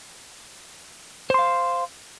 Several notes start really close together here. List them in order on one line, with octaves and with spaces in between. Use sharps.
C5 C6 F5